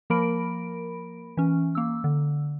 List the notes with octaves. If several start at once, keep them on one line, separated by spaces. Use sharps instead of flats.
F3 A#3 A#4 B5 D7
E3 C#4
A#3 E6
D3